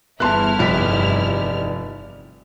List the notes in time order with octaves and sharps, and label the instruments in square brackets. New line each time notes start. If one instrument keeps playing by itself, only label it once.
[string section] G1 E4 F6 [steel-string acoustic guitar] E2 E3 [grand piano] A5 C6 F#6
[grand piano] F1 B6 [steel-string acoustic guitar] E2 G3 D#4